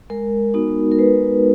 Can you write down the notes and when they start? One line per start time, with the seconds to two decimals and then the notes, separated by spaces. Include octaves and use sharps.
0.10 G#3 A#4
0.54 B3 D#4 F#4
0.92 A#4
0.98 G#3 B4